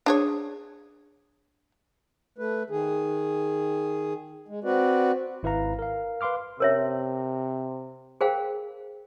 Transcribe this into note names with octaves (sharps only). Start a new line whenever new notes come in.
D4 G#4 C#5
A3 B4
D#3 G#4
G#3
C4 F#4 B4 D5
G#1 E4 B4 F5 A#5
A#4 F5
B4 F5 C6 D6 F6
C3 A#4 C#5 E5
G#4 A#4 C5 F5 G5